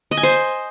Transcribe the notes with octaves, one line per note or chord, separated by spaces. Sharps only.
D#5
G#5
C5